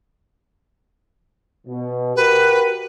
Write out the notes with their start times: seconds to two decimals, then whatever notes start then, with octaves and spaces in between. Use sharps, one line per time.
1.67 B2
2.16 F#4 G4 A#4 B4